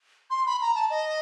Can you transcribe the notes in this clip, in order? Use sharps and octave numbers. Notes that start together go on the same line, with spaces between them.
C6
B5
A#5
A5
D#5